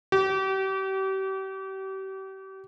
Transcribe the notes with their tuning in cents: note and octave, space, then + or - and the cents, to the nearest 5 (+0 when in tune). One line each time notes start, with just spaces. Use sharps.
G4 -35